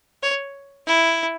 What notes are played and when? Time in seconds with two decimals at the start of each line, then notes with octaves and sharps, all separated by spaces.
0.23 C#5
0.86 E4